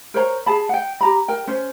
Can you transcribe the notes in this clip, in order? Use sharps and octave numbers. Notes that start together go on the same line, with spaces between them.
A#4 C5 C#5 A#5
G#4 A5 B5
F#5 G5
G4 A#5 B5
A#4 G5
C#4 C5